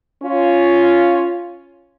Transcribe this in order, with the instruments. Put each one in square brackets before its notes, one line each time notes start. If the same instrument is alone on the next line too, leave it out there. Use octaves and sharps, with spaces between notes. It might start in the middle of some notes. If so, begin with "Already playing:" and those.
[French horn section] C#4 F4